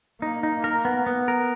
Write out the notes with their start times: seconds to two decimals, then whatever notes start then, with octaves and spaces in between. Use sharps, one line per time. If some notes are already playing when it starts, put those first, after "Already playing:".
0.22 A#3 D#4
0.43 D#4
0.64 A#4
0.85 B3
1.06 B3
1.28 A#4